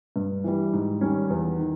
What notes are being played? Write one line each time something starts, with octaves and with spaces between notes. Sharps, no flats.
G2
E3 G3
G#2
D#3 G3 C#4
E2
D#3